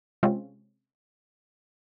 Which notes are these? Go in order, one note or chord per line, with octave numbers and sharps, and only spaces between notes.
C3 G#3 C4 C#4 F4